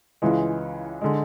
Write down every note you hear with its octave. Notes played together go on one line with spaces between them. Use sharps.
C#2 C#3 E3 G#3
D3 G#3